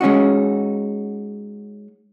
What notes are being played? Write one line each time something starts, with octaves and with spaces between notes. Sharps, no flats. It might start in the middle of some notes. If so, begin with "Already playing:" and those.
G#3 C#4 D#4 F#4